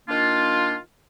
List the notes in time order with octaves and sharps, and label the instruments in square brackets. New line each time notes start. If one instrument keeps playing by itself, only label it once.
[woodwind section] D#3 A#3 D4 F4